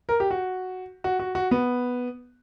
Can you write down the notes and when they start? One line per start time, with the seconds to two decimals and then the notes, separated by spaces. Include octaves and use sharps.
0.09 A#4
0.20 G4
0.31 F#4
1.04 F#4
1.19 F#4
1.35 F#4
1.51 B3